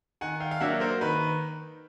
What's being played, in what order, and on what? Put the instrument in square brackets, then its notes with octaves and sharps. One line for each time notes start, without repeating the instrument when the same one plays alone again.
[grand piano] D#3 F#5 G#5
F5 G5
F5
F#3 A#3 D4 E5 F#5
A#4 C5
D#3 B4